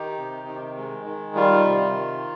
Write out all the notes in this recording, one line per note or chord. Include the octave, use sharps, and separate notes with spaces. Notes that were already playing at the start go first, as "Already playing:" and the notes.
Already playing: D#3 D#4 G4
C3
D#3
G#3
D#3
G3 F4
C3
D#3